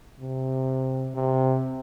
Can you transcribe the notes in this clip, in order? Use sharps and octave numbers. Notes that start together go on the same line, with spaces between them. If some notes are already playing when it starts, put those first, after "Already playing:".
C3
C3